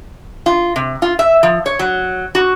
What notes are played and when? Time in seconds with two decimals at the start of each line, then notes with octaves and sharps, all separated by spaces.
0.46 F4
0.76 C3
1.02 F4
1.19 E5
1.43 F3
1.66 C#5
1.79 F#3
2.35 F#4